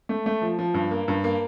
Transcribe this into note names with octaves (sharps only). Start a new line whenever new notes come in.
A3
A3
F3
F3
G2
A#3
G2
A#3